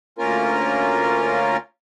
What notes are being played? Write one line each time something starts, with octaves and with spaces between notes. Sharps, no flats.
D2 A#3 C#4 F4 A#4